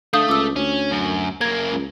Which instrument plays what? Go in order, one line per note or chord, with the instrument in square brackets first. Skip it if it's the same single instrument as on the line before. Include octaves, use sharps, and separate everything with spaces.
[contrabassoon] D3 [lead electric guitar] A3 [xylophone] F5 D#6 G6
[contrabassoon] C#2 [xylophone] D6 E6
[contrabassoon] D2 [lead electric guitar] C#4
[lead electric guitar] F#2
[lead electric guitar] F#2 A#3 [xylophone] G#6
[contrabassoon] C#2